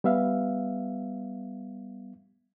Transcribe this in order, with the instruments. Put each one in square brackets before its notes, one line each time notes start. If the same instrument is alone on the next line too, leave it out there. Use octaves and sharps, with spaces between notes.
[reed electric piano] G3 B3 E5 F5